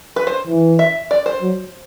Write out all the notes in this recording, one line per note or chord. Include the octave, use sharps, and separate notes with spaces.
B4
C5
E3
E5
D5
C5
F#3